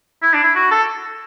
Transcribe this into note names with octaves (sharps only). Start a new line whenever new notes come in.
E4
D4
E4
F#4
A4